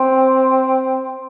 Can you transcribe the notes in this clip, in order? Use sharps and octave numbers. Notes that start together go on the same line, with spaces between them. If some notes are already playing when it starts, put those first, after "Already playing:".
Already playing: C4